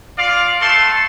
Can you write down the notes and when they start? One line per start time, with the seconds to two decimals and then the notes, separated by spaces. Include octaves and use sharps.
0.19 F4 D5 F5
0.61 A3 A4 A5 C6